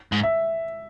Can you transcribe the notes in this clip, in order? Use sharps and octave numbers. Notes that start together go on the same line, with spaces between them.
G#2
E5